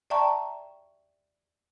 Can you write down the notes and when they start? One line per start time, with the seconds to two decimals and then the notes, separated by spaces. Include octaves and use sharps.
0.10 D5 E5 G5 A5 A#5 C#6